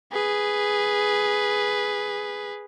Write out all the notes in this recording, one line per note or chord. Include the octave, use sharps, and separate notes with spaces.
G#4 B4